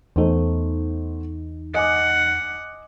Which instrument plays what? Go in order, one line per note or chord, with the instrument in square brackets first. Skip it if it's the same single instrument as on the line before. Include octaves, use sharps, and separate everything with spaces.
[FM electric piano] E2 D#4 [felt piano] A3 B3 C5
[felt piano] D#5 G#5 D6 [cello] F#5